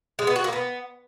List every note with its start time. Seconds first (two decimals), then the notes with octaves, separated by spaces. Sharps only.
0.19 G#3
0.27 B3
0.36 F#4
0.44 A#3
0.53 B3